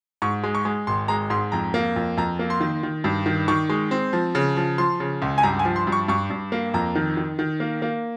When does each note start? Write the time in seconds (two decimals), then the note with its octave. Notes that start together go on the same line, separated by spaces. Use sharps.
0.22 G#2 C#6
0.43 G#3
0.55 C#6
0.65 G#3
0.87 G#1 C6
1.08 G#3 A#5
1.30 G#2 C6
1.52 F2 A#5
1.74 A#3
1.96 F2
2.17 F2 A#5
2.39 A#3
2.50 C6
2.60 D#3
2.83 D#3
3.04 G2
3.26 D#3
3.48 D#3 C#6
3.70 G#3
3.91 C4
4.13 F3
4.35 C#3
4.57 F3
4.78 F3 C6
5.00 C#3
5.22 C#2
5.38 G#5
5.43 G2 A#5
5.59 G#5
5.65 F3
5.76 C6
5.87 G2
5.92 C#6
6.08 G2 C#6
6.30 G2
6.52 A#3
6.74 F2 A#5
6.95 D#3
7.17 D#3
7.39 D#3
7.60 A#3
7.82 A#3